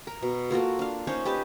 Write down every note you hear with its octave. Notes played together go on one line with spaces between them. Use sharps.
A#4
B2
A#3 F4 F#4 A4
D4 F5
C#4 D#4 C5 C#5
G4 B4 D#5 A5